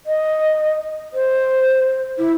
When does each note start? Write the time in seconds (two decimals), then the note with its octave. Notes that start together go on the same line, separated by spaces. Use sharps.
0.06 D#5
1.13 C5
2.18 E4